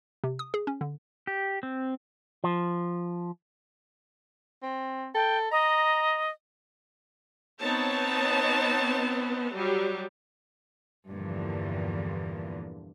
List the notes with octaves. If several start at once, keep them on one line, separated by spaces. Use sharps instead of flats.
C3
D#6
G#4
C#4
D3
G4
C4
F3
C4
A4 G5
D#5 A#5
B3 C4 D#4 C#5 A5
F#3 G3
E2 G2 A#2 D3 E3 F3